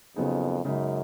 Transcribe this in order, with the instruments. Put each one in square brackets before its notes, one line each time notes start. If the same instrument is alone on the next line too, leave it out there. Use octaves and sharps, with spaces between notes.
[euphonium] F2 [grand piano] C#3 F#3 B3 D#4 G#4
[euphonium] F#2 [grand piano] C#3 G#3 D#4